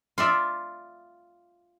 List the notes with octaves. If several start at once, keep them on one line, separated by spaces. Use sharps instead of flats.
F4 D5 E5